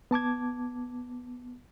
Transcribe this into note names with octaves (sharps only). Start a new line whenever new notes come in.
B3 A5 D6 G#6